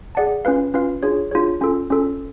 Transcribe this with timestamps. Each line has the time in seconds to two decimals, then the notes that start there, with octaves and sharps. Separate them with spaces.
0.15 G#4 D5 F#5 A5
0.45 C#4 F4 B4 F5
0.74 C#4 F4 B4 F5
1.03 D4 F4 G#4 C#5
1.31 D4 F4 G#4 C#5
1.61 C#4 F4 A4
1.90 C#4 F4 A4